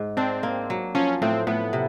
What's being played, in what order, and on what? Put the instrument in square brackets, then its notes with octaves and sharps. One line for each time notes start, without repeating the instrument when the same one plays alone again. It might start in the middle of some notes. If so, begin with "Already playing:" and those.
Already playing: [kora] G#2
[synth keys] C4 [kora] D4
[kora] A#3
F#3
[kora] F3 [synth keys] C#4
[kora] A2 [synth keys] C4
[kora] A2 [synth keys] B3
[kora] C3